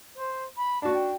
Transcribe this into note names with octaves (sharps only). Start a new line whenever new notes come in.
C5
B5
D4 F#4 A5
G5